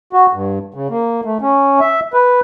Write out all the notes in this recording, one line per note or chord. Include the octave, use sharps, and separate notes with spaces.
F#4
G2
C#3
A#3
A3
C#4
E5
B4